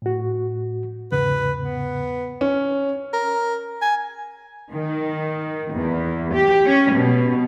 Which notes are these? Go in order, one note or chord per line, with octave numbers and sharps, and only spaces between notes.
A2 F#4
E2 G#2 C#3 B4
B3
C#4
A#4
G#5
D#3
E2
G4
C#4
B2